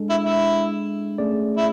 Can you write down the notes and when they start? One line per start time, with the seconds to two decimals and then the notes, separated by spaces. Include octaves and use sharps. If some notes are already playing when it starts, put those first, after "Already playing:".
Already playing: G#3 D4 A4
0.09 E4
0.25 E4
1.18 A3 C#4 G#4 D5
1.57 E4